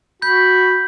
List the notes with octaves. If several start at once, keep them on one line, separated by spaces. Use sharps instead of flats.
F#4 B5 G6